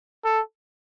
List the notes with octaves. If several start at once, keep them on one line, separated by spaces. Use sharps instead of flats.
A4